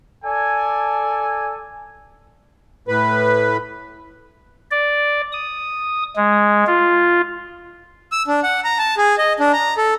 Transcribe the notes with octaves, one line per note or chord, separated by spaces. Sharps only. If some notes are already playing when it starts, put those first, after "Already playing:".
A4 D5 G#5
A2 B4
D5
D#6
G#3
F4
E6
D4
F#5
A#5
A5
G#4
D#5
D4
A#5
A4